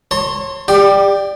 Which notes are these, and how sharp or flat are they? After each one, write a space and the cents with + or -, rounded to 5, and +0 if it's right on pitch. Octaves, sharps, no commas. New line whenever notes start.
C#5 -25 A5 +45 C6 +0
G4 +30 D5 +10 G5 +0